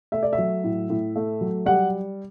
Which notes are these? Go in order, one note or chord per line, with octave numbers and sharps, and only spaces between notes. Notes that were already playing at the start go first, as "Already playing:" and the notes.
A3 E5
D5
E5
F#3
A2
A2
A3
F#3
G3 F#5